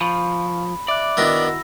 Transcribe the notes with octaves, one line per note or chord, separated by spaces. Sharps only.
F3 F5 B5 C#6
D5 E5 D6 F#6
D#3 B3 D4 E4 F#4 F#5 E6 A#6